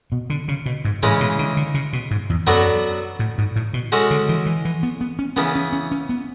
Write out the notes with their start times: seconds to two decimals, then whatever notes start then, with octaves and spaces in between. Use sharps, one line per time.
0.12 B2
0.30 D3
0.48 C#3
0.66 B2
0.85 G#2
1.03 A2 C#3 E3 G#3 C#4
1.20 B2
1.39 D3
1.57 D3
1.74 C#3
1.93 B2
2.11 G#2
2.30 E2
2.47 F#2 F#3 B3 D4 F#4 A4
3.19 A2
3.38 G#2
3.56 A2
3.73 B2
3.92 G#3 C#4 F#4 A4
4.10 D3
4.29 E3
4.46 E3
4.65 E3
4.83 B3
5.01 B3
5.19 C#4
5.36 C#3 E3 B3 C#4
5.55 C#4
5.73 C#4
5.91 C#4
6.09 B3